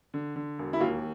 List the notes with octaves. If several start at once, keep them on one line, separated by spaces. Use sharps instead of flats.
D3
D3
E1
E4
D#2 F4